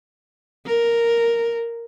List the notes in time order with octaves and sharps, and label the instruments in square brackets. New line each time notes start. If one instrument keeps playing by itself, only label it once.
[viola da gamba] A#4